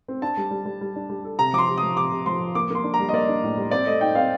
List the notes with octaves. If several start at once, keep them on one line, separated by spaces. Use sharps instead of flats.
C4
D4 A5
G3
G3
G3
G3
D4
G3
A4
C3 A#5
F3 D6
C6
C3
D#6
F3
C3 D6
C3
F3 C6
F3
A#3 D6
A#3 C6
D4
A#5
G3
D#5
A#3 D5
D4
A2
G3
C4 D5
A3 D#5
D#4 G5
C4 F5